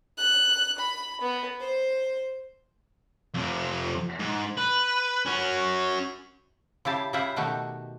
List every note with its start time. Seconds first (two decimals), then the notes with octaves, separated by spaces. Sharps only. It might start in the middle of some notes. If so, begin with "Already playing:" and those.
0.17 F#6
0.78 B5
1.21 B3
1.60 C5
3.34 F2 C3
4.20 G#2
4.57 B4
5.25 C#4 F#4
6.85 C#3 E4 G4 A5
7.13 C#3 E4 F4 G4 E5 F#5
7.36 B2 D#3 A3 F#4 G4